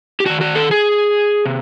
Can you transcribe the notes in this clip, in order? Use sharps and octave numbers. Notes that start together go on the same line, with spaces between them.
G4
C3 D#3 F#4
F#4
A4
G#4
C3